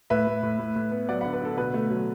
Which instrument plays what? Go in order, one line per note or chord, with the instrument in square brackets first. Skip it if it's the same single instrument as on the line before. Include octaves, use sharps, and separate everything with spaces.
[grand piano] A2 B4 E5
A2
A2
A2
A2
B3
F#3 D5 F#5
D3 F#5 B5
B4
D3 A4
B2 B4
A3
F#3